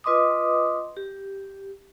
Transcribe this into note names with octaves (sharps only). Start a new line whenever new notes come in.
F4 B4 D#5 C6 D6 D#6
G4